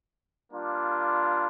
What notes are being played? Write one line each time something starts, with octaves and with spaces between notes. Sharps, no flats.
G3 A#3 D4 F4